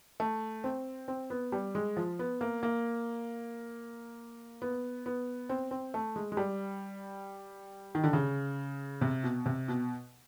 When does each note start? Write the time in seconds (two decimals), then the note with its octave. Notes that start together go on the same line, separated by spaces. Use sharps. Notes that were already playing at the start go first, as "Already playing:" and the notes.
0.20 A3
0.64 C4
1.08 C4
1.30 B3
1.52 G3
1.75 G#3
1.97 F3
2.19 B3
2.41 A#3
2.63 A#3
4.62 B3
5.06 B3
5.49 C4
5.71 C4
5.94 A3
6.16 G#3
6.32 G#3
6.37 G3
7.95 D#3
8.04 D3
8.13 C#3
9.01 C3
9.23 B2
9.46 C3
9.68 B2